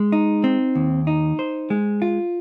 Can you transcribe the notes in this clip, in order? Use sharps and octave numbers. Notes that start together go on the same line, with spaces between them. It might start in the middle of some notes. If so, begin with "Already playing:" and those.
Already playing: G#3
D#4
C4
D#2
D#4
C5
G#3
F4